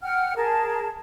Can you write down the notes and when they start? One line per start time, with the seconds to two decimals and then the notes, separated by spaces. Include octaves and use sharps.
0.03 F#5 G5 F6
0.36 G#4 A#4 A5